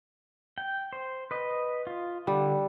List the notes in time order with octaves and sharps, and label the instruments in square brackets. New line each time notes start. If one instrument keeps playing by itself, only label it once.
[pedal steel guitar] G5
C5
B4 D#5
F4
[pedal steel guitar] D3 [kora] G3